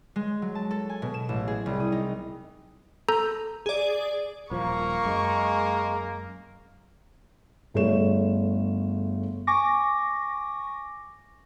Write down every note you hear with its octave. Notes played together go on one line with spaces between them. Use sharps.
G#3
F#3
A5
A4
G#5
B2
E7
A1
G#4
C2
D#6
D#4
A4 A#5 G6
G#4 D5
D#1 F3 A#3 C#6
F#2 G#3
G1 A3 G#4 C#5 E7
G#5 C#6 D6 A#6